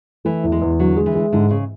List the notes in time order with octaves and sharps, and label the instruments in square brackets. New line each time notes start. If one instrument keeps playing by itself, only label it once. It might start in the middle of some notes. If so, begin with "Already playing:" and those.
[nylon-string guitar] E3 [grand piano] A3
[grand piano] E2
[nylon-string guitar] G#3
[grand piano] E2
[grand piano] D3 [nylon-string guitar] F#3
[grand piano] G#3
[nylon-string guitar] E3
[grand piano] G#3
[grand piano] G#2 [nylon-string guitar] D3
[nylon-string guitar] C#3